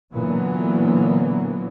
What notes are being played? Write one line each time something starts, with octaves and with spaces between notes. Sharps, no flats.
A#2 D3 E3 F#3 B3